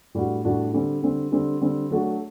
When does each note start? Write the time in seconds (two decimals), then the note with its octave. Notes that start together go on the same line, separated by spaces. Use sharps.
0.15 A2 G3 D4 F#4
0.45 A2 G3 D4 F#4
0.74 D3 G3 C4
1.02 D3 G3 C4
1.32 D3 G3 C4
1.61 D3 G3 C4
1.91 F#3 A3 D4 F#4